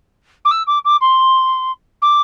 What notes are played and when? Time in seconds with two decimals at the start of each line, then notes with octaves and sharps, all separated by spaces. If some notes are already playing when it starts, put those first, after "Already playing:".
0.45 D6
0.51 E6
0.67 D6
0.85 D6
1.01 C6
2.02 D6